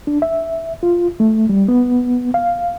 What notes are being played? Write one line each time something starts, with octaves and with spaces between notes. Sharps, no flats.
D4
E5
F4
A3
G3
B3
F5